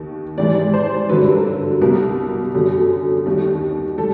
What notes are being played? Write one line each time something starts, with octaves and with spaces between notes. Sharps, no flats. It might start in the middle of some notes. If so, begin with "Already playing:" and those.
Already playing: D#2 D#3
G#2 E3 G3 D5
C5
G2 D3 F#3 B4
A#4
C2 B2 G3 A#4
F#2 D3 G3
D#2 D#3 G3
G3 A4